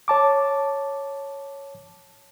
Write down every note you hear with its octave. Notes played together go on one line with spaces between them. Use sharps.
C#5 A5 D6